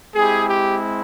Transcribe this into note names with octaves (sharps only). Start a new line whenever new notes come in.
G#3 C4 E4 G4 G#4
G4